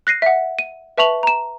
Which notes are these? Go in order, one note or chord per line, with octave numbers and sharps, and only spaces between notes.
F#6 A#6 C7 D#7
E5 F#5
D#7
B4 E5 A5 C#6 F7 F#7
A#5 E7